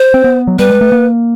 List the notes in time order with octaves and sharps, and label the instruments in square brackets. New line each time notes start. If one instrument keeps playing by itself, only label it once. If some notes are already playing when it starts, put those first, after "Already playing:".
Already playing: [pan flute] C5
[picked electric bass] C4
B3
F#3
[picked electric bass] G3 [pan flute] B4
[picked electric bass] G#3
A3
A#3